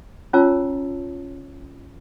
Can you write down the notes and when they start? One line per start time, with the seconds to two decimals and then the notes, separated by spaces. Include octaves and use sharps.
0.33 C#4 F4 C#5 A5 A#5 E6